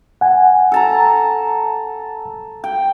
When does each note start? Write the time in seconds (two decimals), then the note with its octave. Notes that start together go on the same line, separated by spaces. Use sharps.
0.21 F#5 G#5
0.72 A4 A5 A#5
2.64 G5